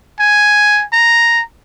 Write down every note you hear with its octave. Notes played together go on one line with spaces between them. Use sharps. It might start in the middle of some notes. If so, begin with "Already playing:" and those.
G#5
A#5